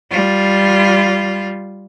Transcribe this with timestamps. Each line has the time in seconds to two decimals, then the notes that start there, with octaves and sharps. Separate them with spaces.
0.11 G3 F4